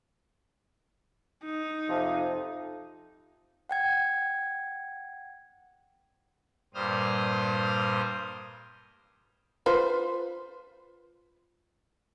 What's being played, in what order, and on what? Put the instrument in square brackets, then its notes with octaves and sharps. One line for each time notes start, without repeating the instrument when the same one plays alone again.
[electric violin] D#4
[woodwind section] F2 C3 F3
[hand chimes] F#5 G5 G#6
[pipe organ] G2 A#2 G3 C5 D#6 F6
[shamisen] F4 B4 C5